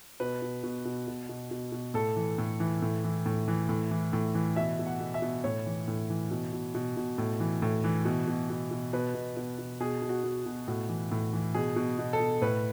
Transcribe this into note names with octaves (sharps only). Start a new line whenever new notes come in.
B2 B4
B2
B2
B2
B2
B2
B2
B2
A2 A4
E3
A2
E3
A2
E3
A2
E3
A2
E3
A2
E3
B2 E5
B2
F#5
B2
E5
B2
A2 C#5
E3
A2
E3
B2
B2
B2
B2
A2
E3
A2
E3
B2
B2
B2
B2
B2 B4
B2
B2
B2
B2 G#4
B2
F#4
B2
B2
A2 F#4
E3
A2
E3
B2 G#4
B2
B2
A4
B2
A2 B4